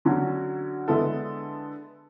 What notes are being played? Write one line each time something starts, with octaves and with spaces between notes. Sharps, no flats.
D3 F#3 C#4 F#4
D3 G#3 B3 E4 A4